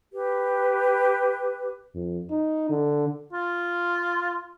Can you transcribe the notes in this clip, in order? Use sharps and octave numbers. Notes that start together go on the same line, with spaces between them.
G4 B4
F2
D#4
D3
F4